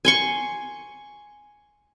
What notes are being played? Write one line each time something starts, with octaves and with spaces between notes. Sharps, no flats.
G#5 C6 C#6